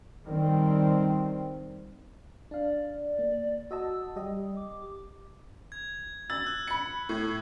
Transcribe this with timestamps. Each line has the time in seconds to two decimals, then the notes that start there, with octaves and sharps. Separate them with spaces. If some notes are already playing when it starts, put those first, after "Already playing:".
0.25 D#3 G3 C4
2.51 D4 D5 F5
3.19 A#3
3.71 F#4 D#5 A5 E6
4.16 G3 G4 D#5
4.57 D6
5.72 G#6
6.30 E6 A6
6.44 E6 F#6
6.67 B5 C#7
7.09 A2